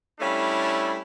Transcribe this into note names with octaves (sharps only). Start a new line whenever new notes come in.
G3 A3 C#4 D4 E4